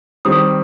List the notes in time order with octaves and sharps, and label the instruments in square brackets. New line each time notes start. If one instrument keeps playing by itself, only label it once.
[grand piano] D#3 G3 C4 [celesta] D#6